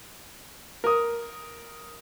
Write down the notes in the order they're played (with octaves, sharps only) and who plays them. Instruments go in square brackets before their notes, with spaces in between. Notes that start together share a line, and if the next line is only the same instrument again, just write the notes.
[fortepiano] A#4 D#6